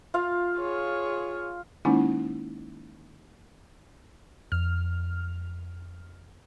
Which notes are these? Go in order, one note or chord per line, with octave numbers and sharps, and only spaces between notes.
F4 F5
G#4 C#5
D#3 G#3 A#3 C#4 D#4 E4
F2 F6